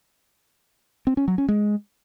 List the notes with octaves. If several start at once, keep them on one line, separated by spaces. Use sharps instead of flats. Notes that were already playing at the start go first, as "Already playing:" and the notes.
C4
C#4
F#3
C#4
G#3